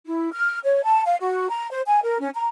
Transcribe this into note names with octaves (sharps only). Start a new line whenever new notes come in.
E4
F6
C#5
A5
F5
F#4
A#5
C5
G#5
A#4
C#4
A#5